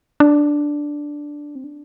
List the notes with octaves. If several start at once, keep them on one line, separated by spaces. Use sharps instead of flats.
D4
C4
D4